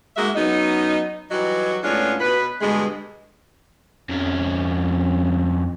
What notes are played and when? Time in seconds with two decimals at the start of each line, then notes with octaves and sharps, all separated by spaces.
0.16 G#3 A#3 D#4 F#4 E5
0.35 F#3 B3 C#4 D#4
1.30 E3 F#3 G3 D#4 F#4
1.83 A2 G#3 B3 C#4 D4 F4
2.21 B2 B4
2.61 G2 B2 D3 G#3
4.09 F2 C#4